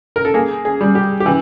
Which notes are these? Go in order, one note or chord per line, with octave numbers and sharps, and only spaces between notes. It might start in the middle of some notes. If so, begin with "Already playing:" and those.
A#4
A4
A#3 G#4
G#4
G3
G4
G4
E3